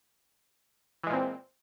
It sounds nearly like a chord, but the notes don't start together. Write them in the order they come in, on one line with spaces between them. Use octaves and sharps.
E3 G#3 A#2 C4